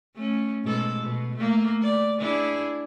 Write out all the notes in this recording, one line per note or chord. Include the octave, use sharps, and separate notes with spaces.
A3 C#4
G#2 B2 A4
B2
A3 A#3
D5
D4 E4 G#4